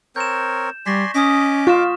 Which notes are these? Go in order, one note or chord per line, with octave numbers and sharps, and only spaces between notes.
C4 A#4 C#5 G6 E7
G3 D5 G#5 C6 C#6 A#6 B6
C#4 D#5 D6 D#6 B6
F4 C#6 F6 E7